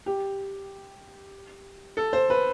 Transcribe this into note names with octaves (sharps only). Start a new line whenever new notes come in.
G4
A4
C5
B4